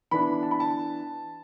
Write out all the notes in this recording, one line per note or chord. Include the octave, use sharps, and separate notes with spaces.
E3 B3 D4 B5
A5
B5
A5